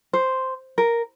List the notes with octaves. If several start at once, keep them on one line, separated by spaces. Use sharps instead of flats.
C5
A#4